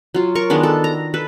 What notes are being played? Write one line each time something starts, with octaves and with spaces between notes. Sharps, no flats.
F#3 F4
A#4 C#6
D#3 G#3 B3 D4
A4
A#5
A4 B4